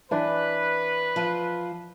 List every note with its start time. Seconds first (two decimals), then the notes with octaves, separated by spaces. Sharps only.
0.11 E3 D4 B4 D5
1.16 F3